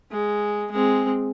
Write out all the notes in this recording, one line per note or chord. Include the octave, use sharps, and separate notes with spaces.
G#3
G#3 C4